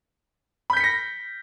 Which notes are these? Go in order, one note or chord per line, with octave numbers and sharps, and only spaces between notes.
B5 G6 A#6 B6 C#7